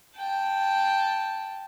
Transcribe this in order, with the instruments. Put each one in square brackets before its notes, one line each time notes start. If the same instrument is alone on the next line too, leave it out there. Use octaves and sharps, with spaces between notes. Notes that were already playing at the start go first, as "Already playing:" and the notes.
[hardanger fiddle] G5 A5